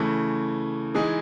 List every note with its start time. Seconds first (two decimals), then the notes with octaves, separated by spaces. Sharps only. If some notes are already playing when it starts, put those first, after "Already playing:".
Already playing: C#3 E3 A3
0.94 E3 G#3 D#4 G#4